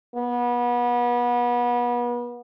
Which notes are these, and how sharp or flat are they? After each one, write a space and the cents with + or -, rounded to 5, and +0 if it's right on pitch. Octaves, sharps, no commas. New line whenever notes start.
B3 -30